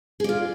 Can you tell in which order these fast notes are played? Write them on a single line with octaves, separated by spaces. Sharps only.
G#4 D5 F4